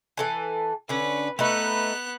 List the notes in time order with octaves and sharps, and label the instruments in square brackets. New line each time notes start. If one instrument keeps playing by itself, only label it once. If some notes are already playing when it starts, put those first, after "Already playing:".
[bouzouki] E3 A4 G#5
[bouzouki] D3 C#4 [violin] B4
[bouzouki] A3 D#4 B4 [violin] B3 F#6